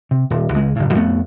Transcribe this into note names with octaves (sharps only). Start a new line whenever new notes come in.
C3
D#1
C#2 G#3
F#1 A2
F2 A3 B3